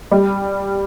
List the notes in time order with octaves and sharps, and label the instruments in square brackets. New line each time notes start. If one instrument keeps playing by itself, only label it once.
[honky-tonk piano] G3